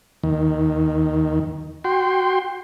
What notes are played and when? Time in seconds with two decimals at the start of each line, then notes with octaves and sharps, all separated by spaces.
0.23 D#2 D#3
1.84 F#4 G5 C6